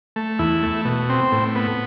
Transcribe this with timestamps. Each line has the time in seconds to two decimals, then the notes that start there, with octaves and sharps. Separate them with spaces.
0.16 A3
0.39 E2 E4
0.62 A3
0.85 B2
1.10 C4
1.32 A2
1.55 B3